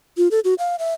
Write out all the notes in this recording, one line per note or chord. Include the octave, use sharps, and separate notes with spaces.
F4
A4
F#4
F5
E5